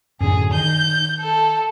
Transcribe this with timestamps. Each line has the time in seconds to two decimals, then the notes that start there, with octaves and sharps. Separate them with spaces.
0.20 F#2 A2 D3 G#4
0.53 D#3 G6
1.20 A4